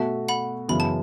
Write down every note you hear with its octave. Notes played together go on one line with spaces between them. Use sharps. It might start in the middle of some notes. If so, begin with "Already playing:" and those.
Already playing: B2 A3 F#4 E5 A5
F#5 B5
F#2 C#3 E3 B3 B5
A5